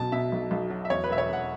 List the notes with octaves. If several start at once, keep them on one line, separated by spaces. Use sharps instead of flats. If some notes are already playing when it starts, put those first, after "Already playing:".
Already playing: B1 B2 A5
B2 E5
B1
B1
F#3
E5
E2 C#5
B4
E1 E5
C#5
E1 F#5